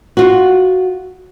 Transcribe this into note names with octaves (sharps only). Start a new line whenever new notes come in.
F4 F#4